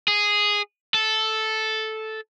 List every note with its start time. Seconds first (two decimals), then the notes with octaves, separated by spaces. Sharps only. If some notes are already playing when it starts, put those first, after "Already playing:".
0.08 G#4
0.94 A4